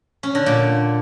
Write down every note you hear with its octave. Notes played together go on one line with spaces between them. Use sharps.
C#4
D3
A#2